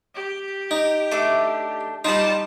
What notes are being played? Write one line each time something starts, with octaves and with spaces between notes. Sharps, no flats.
G4
D#4
A3 D4 D6
G3 D#4 F4 D5 A5